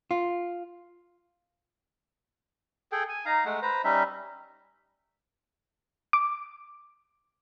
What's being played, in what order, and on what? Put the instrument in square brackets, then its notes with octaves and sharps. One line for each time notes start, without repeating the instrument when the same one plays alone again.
[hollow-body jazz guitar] F4
[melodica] G#4 A4 G5
G#5
D#4 F5 A#5
G#3 A3 F#5
B4 C5 A#5
G3 C#4 D#4 E5
[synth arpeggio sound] D6